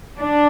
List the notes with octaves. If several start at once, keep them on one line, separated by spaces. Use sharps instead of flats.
D4